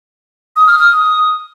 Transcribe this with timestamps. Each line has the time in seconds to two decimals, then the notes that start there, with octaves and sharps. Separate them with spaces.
0.56 D#6
0.67 F6
0.78 D#6